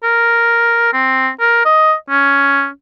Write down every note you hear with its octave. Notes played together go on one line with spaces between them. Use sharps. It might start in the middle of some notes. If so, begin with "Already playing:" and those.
A#4
C4
A#4
D#5
C#4